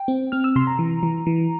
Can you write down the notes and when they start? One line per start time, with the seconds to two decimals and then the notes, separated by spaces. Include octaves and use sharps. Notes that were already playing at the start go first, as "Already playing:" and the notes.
Already playing: G5
0.08 C4
0.32 C4 F6
0.44 E6
0.56 C3 C6
0.67 A#5
0.79 E3
1.03 E3
1.27 E3